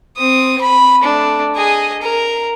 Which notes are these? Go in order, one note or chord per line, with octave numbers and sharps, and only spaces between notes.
C4 D#6
B5
A3 D4
G#4 D#5
A#4